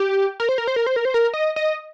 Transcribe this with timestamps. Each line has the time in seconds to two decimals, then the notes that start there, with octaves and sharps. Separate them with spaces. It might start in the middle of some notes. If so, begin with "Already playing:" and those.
Already playing: G4
0.40 A#4
0.49 C5
0.58 A#4
0.67 C5
0.76 A#4
0.87 C5
0.96 A#4
1.05 C5
1.14 A#4
1.34 D#5
1.56 D#5